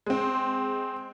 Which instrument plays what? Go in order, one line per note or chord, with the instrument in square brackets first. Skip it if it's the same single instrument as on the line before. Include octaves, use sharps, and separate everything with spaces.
[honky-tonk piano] G#3 C4